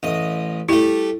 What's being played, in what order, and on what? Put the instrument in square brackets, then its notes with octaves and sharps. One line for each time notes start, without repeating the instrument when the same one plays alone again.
[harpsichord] A1 D#5
[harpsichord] G3 A3 [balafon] E4